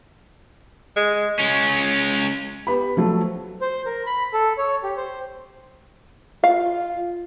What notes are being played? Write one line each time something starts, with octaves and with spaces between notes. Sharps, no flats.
G#3
G#3 C#4
B3 G4 B5
F3 F#3 A3
C5
A#4
B5
A4
C#5
G4
C5
F4 F5